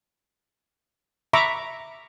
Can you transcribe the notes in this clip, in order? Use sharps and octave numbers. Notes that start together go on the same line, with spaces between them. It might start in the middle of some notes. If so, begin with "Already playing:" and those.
E5 A#5 B5 C#6 D6